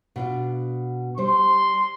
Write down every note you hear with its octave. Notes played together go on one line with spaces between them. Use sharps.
B2 D4 F4
G3 C5 C6